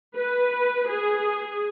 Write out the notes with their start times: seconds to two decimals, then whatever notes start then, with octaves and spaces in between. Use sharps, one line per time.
0.17 B4
0.90 G#4